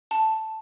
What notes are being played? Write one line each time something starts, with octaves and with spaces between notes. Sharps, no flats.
A5